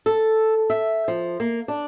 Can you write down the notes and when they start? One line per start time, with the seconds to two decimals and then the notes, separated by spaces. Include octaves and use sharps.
0.06 A4
0.70 E5
1.08 F3
1.40 A#3
1.68 D4